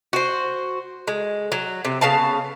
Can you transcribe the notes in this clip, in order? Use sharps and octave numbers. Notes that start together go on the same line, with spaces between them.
F#4 C5
G#3
F#3
C3
C#3 B3 F5 A5